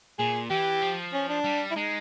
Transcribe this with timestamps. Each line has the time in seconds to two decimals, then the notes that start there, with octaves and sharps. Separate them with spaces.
0.19 A#2 G#4
0.50 E3 G4
0.82 F3
1.13 C#4
1.29 D4
1.44 G3
1.71 E4
1.76 G#3 D#4